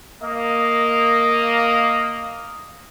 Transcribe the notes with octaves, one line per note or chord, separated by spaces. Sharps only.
A#3 D#5